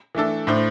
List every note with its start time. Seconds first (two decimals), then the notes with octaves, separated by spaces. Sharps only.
0.15 E3 A3 D4 A4
0.47 A2 A3 D4 C5